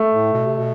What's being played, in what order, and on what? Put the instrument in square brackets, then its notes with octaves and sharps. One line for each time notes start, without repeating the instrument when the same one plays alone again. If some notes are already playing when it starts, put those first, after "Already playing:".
Already playing: [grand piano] A3
[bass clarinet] A2
B2
C3
B2